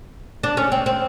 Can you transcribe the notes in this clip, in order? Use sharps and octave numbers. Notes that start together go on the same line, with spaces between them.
D4
C#4
C4
C4